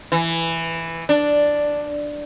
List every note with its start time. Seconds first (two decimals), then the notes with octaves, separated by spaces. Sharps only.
0.12 E3
1.09 D4